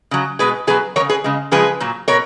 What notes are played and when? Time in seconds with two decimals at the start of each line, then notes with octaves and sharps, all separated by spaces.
0.11 C#3 F#3
0.39 B2 G#3 G#4 B4
0.67 B2 F#3 G#4 B4
0.96 F#3 A#4 C#5
1.00 C#3
1.09 G#4 B4
1.24 C#3 G#3
1.51 C#3 F3 G#3 G#4 B4
1.80 A#2 F#3
2.08 B2 A#4 C#5